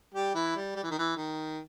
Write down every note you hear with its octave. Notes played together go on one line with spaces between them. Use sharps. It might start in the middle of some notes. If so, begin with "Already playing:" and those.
G3 G4
E3 E4
G3
G3
E3
D#3
E3
D#3